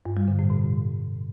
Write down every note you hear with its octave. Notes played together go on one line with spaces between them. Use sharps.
G2
G3
D3
A2
B2